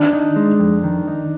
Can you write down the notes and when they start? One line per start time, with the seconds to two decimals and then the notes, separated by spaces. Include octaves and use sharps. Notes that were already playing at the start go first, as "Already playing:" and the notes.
Already playing: D#3 D4
0.13 D#4
0.36 G#3
0.60 F2
0.84 D#3
1.07 D#4